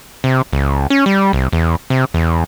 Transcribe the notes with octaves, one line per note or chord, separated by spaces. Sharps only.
C3
C#2
C#4
G3
C2
E2
C3
E2